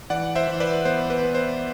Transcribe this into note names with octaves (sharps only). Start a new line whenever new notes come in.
E3 D5 F#5
C5 E5
E3
B4 D5
B3 C5
B4
B3
C5